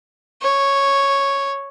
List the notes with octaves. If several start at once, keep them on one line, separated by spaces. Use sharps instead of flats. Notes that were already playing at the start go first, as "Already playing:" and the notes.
C#5